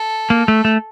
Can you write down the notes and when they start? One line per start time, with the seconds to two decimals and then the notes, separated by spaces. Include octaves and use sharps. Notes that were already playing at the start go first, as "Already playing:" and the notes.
Already playing: A4
0.30 A#3
0.48 A3
0.65 A3